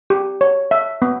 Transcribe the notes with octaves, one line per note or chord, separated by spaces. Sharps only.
G4
C#5
E5
B3